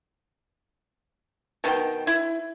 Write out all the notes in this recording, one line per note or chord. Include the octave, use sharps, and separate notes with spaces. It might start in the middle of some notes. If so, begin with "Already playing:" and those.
B2 D#3 C#4 G5
E4